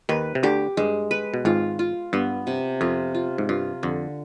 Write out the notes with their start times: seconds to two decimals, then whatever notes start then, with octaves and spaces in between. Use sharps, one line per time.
0.09 D#2 D#3 B4
0.35 C3
0.43 D2 D3 G4
0.77 G2 G#3
1.11 B4
1.34 B2
1.45 G#1 G#2 F4
1.79 F4
2.13 G2 B3
2.47 C3
2.81 F2 F4
3.14 F4
3.38 G#2
3.49 G2 F4
3.83 F2 D3